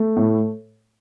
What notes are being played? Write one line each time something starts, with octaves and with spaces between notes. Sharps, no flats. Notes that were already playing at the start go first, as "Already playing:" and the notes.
Already playing: A3
A2